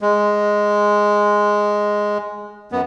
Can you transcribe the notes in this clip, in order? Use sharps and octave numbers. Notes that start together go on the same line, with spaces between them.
G#3
F#2 B3